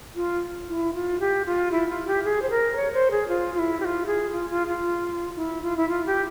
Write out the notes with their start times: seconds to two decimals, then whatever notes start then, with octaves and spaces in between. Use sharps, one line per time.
0.15 F4
0.68 E4
0.93 F4
1.20 G4
1.45 F4
1.72 E4
1.89 F4
2.07 G4
2.24 G#4
2.42 C5
2.50 A#4
2.76 C#5
2.93 C5
3.11 G#4
3.28 F4
3.54 F4
3.59 E4
3.80 G4
3.84 F4
4.06 G#4
4.32 F4
4.50 F4
4.67 F4
5.36 E4
5.62 F4
5.77 E4
5.89 F4
6.06 G4